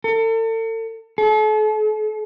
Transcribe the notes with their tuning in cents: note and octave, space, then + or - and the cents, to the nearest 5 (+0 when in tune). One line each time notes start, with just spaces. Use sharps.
A4 +40
A4 -40